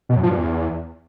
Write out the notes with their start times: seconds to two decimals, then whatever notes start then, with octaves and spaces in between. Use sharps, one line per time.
0.09 B2
0.16 F#2
0.23 F3
0.30 G2
0.37 E2